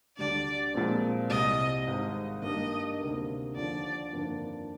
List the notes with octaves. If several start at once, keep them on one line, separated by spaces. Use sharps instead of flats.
D2 D3 G3 D4 D5
A#2 F3 G#3 C4
C2 C3 G3 D#5
G#1 G#2 D#3
G2 D#3 A#3 D4 G4 D#5
D2 C3 D#3 A#3
D#2 D3 F3 D5
G1 F2 D#3 A#3 D4